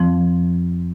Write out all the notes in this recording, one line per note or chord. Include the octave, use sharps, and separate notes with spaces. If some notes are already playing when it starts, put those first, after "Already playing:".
Already playing: F2 F3 C4